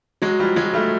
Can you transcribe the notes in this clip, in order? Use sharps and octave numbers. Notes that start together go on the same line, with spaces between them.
F#3 G#3
F3 G3
F#3 G#3
G3 A3